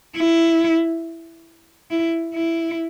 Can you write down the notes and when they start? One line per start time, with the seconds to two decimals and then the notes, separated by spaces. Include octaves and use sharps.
0.17 E4
1.91 E4
2.34 E4